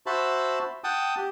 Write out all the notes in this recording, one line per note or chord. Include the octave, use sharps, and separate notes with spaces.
F#4 C5 E5 A5 B5
F#5 G5 A5 D#6
G4